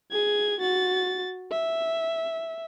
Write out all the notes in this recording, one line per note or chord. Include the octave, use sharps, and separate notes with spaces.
G#4 G#6
F#4 A6
E5